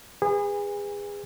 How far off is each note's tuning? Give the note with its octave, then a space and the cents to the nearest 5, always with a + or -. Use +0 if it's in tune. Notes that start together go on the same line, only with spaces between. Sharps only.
G#4 -30 B4 +0